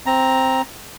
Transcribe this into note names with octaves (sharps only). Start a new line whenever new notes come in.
C4 A#5